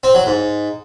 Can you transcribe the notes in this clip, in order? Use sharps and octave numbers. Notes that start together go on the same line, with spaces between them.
C4
F#3
G#2